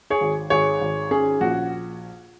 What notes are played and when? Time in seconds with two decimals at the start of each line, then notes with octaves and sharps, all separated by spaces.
0.10 G#4 C#5
0.21 G#1
0.50 G#1 G#4 C#5
0.81 G#1
1.11 C#4 G#4
1.41 A#1 F#4